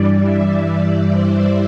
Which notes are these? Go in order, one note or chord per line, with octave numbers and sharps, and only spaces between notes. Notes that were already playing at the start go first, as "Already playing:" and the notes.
Already playing: G2 E3 G3 D5
E5
C5